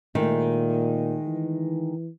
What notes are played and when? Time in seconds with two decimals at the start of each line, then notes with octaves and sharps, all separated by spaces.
0.15 A#2 D#3 G#3 A3
1.27 E3